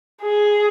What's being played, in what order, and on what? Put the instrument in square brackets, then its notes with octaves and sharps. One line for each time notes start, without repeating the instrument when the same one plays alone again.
[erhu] G#4